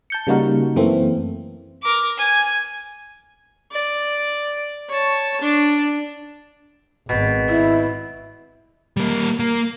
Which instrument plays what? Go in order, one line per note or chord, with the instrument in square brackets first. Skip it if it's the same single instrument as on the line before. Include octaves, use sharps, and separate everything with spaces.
[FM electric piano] A5 G6 C#7
C#3 G3 A#3 D#4 F#4 A#4
F#2 E3 A3 A#3 C4
[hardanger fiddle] A#4 D6
G#5
[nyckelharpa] D5
C#5 A5
D4
[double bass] G#1 [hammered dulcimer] B2
[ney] E4
[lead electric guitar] G3 A#3
A#3